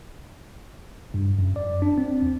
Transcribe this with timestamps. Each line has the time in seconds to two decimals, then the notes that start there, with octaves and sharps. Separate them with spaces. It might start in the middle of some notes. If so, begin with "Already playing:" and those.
1.14 G2
1.39 F#2
1.56 D5
1.82 D4
1.98 C4
2.22 D#2